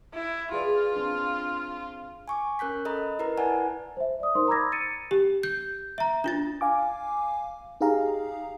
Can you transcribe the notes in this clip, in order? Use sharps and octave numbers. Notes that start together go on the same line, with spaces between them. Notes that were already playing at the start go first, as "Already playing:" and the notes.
E4
F4 G#4 B4 D5
C4 D4
G#5 C#6 D6
C#4 A#4 F#6 G6 B6
A4 D#5 A#5 B5
E4 A#4 B4 A#5
E4 B4 D5 F#5 G#5 A5
C5 E5
D5 D#6
D#4 A#4 C5 C6 D#6
A#5 B5 D6 E6 G#6 A#6
A6 C#7 D#7
G4
G6
E5 A#5
D4 F4 A6
F5 G#5 D6
D#4 G4 G#4 F5 A#5